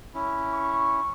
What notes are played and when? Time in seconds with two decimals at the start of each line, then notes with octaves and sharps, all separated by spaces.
0.15 C#4 E4
0.53 C#6